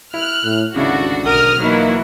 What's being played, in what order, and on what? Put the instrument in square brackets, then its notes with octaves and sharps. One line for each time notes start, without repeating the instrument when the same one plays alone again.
[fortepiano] E4 [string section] F6 F#6
[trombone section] A2
[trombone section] G#1 D2 [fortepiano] C#3 E4 [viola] D4 [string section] F#4
[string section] B1 D#6 F6 [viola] A#4 [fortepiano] F#5
[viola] E3 F#3 [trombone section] A#3 D#4 [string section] E4